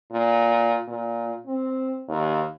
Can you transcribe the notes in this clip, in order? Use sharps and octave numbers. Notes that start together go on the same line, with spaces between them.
A#2
A#2
C4
D#2